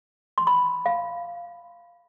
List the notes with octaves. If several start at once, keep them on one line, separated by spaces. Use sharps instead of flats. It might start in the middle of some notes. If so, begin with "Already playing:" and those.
C6
B5
F5